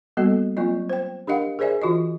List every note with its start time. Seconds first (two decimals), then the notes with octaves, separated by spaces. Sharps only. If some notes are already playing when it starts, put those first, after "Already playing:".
0.17 G3 A#3 B3 F#4 A4 D#5
0.57 F#3 A#3 C4 F4 D#5
0.90 C5 G5
1.27 D4 G4 A#4 D#5 F5 F#5
1.59 G#4 A#4 C5 D5 E5 G#5
1.82 E3 F4 F#4 D#5